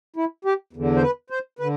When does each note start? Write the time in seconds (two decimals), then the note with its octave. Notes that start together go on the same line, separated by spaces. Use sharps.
0.16 E4
0.45 G4
0.73 E2 D3
0.96 C5
1.02 B4
1.30 C5
1.59 D3 B4